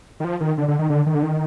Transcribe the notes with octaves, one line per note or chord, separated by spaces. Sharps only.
D#3
F3
D#3
D3
D3
D#3
D3
D#3
D3
D#3